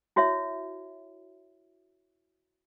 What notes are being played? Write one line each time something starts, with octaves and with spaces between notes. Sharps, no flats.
E4 F#4 C#5 E5